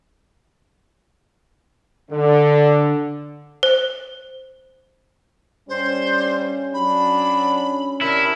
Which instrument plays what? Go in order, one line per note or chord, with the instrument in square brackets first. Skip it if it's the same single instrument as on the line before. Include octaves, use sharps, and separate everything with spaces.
[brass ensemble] D3
[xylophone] C5
[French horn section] G2 G3 [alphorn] C#4 [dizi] C5
[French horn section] F#3 D4 [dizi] B5
[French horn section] C3 D4 [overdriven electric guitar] E4 [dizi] A#4